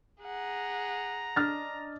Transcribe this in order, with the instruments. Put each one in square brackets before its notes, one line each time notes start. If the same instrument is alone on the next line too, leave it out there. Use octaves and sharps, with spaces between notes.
[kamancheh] G#4 F#5 [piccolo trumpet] A#5
[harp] D4 D#5 [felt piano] F6 A6